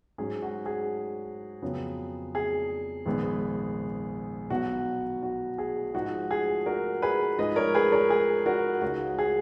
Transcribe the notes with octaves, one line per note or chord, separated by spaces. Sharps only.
G#2 F#3 C#4 G#4
F#4
G#4
F2 C#3 F#3 B3
G#4
A#1 G#2 D#3 G#3 B3
B1 B2 F#3 B3 F#4
F#4
G#4
G#2 F3 G#3 D#4 F#4
G#4
F#4 A#4
G#4 B4
G#2 F3 G#3 D#4 B4 D#5
A#4 C#5
G#4 B4
A#4 C#5
G#4
F#4 A#4
C#2 C#3 G#3 D#4 F#4
G#4